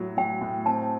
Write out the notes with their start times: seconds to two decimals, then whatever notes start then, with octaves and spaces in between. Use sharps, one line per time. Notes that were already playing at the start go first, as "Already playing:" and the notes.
Already playing: A2 F#3
0.17 F#3 G5
0.41 A2
0.66 C4 A5